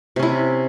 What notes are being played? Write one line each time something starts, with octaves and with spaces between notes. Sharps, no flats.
C3 C#4 E4